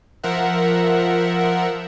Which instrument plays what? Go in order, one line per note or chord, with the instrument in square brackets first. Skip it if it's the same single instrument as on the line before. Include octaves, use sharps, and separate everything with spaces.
[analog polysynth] F3 A#4 E5 F#5